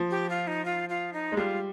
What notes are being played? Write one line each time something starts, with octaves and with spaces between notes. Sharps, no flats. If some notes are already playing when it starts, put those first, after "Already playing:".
Already playing: F3
G4
F4
D#4
F4
F4
D#4
G#3
G3 F4